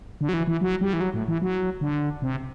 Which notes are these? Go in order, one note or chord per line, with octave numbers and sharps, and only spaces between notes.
D3
F#3
E3
E3
F#3
G3
E3
F#3
A2
E3
F#3
D3
C3